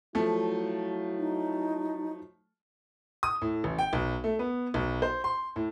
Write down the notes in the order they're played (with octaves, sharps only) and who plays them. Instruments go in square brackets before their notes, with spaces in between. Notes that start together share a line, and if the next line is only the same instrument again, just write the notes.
[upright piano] F3 A3 [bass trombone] F#3 [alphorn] E4
[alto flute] D#4
[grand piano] D#6
A2
A1
G5
B1
A3
B3
B1
C5
C6
A2